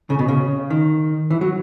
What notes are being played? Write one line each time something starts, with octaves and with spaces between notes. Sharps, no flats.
C#3
B2
C#3
D#3
E3
F#3